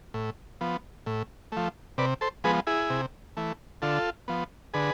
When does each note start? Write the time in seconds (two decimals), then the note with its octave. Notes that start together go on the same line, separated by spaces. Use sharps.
0.14 A2
0.61 F3 B3
1.06 A2
1.52 F3 A3
1.98 C3 B4 D5
2.21 A4 C5
2.44 F3 G#3 B3 G#4 B4
2.67 E4 G#4
2.90 C3
3.37 E3 A3
3.82 D3 F4 A4
4.28 F3 B3
4.74 D3 G#4 B4